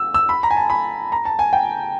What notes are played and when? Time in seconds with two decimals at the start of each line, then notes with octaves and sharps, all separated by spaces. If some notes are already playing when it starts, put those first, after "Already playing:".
Already playing: E6
0.14 E6
0.29 B5
0.43 A#5
0.51 G#5
0.57 A5
0.70 B5
1.12 A#5
1.25 A5
1.39 G#5
1.53 G5